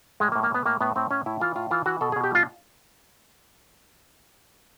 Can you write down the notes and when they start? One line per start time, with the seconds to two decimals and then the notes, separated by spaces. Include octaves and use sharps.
0.20 A2 G#3
0.32 A#3
0.36 A2
0.43 A#3
0.50 A2 B3
0.65 A2 A#3
0.81 A2 B3
0.96 A2 C4
1.11 A2 C#4
1.26 A2 E4
1.40 E3 F4
1.55 A2 F4
1.71 E3 F4
1.86 E3 F#4
2.01 B2 A4
2.12 G#4
2.16 B2
2.24 G4
2.31 G3 F4